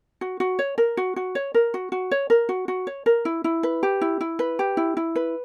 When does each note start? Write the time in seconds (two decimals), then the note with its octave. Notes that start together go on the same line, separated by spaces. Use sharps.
0.21 F#4
0.40 F#4
0.59 C#5
0.78 A#4
0.97 F#4
1.16 F#4
1.35 C#5
1.54 A#4
1.74 F#4
1.92 F#4
2.11 C#5
2.30 A#4
2.49 F#4
2.68 F#4
2.87 C#5
3.06 A#4
3.25 E4
3.44 E4
3.63 B4
3.83 G4
4.01 E4
4.21 E4
4.39 B4
4.59 G4
4.77 E4
4.97 E4
5.16 B4